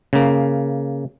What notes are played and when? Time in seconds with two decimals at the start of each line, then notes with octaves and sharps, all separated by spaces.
0.13 C#3 A#3